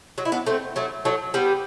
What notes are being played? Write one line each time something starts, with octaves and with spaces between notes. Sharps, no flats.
F#3
E4
B3 D4
A3 C4
F#3 A3
F#3 A3
G3 B3